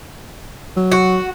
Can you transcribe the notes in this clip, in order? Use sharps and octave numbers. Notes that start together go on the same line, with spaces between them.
F#3
F#4